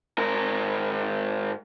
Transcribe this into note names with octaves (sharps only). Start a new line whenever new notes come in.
G#2 A#4